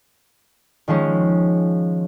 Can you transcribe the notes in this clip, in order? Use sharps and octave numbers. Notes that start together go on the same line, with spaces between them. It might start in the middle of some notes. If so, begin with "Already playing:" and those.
D#3 F3 G#3 C#4